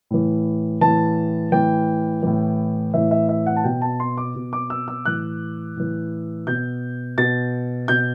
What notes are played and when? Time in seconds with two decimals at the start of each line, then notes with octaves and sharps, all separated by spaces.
0.11 A2 E3
0.81 A2 E3 A5
1.52 A2 E3 G5
2.23 A2 E3
2.94 A2 E3 E5
3.11 E5
3.29 E5
3.46 F#5
3.56 A5
3.64 B2 G5
3.82 A5
4.00 C6
4.17 D6
4.35 B2
4.53 D6
4.70 E6
4.88 E6
5.05 A2 E3 F#6
5.76 A2 E3
6.47 B2 G6
7.18 B2 A6
7.88 B2 G6